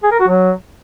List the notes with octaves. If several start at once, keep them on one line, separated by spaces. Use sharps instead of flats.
G#4
A#4
F#4
F#3